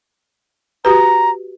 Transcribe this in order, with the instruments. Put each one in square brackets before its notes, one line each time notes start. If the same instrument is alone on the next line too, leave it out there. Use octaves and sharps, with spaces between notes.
[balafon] F#4 G4 B4 [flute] A#5